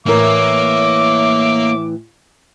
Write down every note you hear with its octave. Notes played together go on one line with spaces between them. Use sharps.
A2 E3 A#3 A#4 C#5 E5 D6